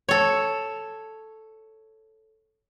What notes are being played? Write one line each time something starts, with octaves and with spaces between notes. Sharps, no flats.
A4 C#5